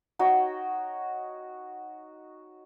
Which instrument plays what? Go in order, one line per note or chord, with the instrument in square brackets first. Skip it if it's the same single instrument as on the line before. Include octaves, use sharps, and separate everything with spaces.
[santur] D#4 F#4 C#5 G5